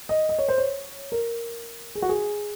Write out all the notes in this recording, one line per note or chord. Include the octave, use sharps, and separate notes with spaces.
D#5
D#5
C#5
C5
C#5
A#4
G#4
F#4
G#4